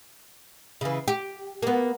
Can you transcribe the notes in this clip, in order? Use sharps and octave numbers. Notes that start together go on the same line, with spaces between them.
C#3 E3
G4
A#3 B3